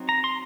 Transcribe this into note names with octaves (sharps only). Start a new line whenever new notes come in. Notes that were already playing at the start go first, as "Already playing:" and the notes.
Already playing: F#3 C4 D#4
A#5
C6